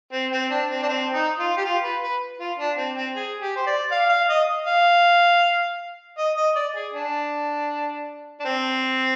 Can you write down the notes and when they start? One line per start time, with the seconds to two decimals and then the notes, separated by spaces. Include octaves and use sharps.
0.13 C4
0.32 C4
0.51 D4
0.70 C4
0.83 D4
0.89 C4
1.14 D#4
1.39 F4
1.57 G4
1.65 F4
1.83 B4
2.01 B4
2.40 F4
2.58 D4
2.77 C4
2.96 C4
3.15 G#4
3.41 G4
3.56 C5
3.66 D5
3.91 F5
4.09 F5
4.29 D#5
4.67 F5
6.18 D#5
6.37 D#5
6.56 D5
6.75 G#4
6.93 D4
8.40 D4
8.45 C4